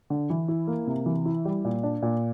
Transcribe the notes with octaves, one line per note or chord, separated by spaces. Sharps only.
D3
E3
E4
A#3
C3
E3
E4
G3
A#2
D4
A#2